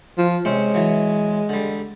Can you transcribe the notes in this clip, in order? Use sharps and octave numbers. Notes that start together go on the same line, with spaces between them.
F3
C3 G#3 C4 C#4
E3 F#3
D3 G3